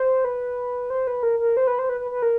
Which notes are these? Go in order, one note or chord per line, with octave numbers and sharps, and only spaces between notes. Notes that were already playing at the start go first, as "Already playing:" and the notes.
Already playing: C5
B4
C5
B4
A#4
A#4
C5
B4
C5
B4
B4
B4
A#4